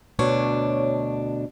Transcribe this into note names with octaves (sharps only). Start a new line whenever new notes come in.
D2 B2 D4 C#5